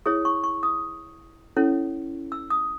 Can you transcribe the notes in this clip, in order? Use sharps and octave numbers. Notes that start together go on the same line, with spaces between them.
E4 G#4 C#5 D#6
C#6
C#6
D#6
C#4 E4 A4 C#5
E6
D#6